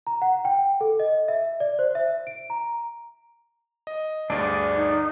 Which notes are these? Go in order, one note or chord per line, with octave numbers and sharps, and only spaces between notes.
A#5
F#5
G5
A4
D#5
E5
D5
C5
E5
D7
A#5
D#5
D2 G2 D4 G#4 D5
D#4